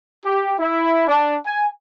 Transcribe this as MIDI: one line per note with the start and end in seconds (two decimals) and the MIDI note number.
0.25 0.54 67
0.59 1.06 64
1.07 1.35 62
1.46 1.67 80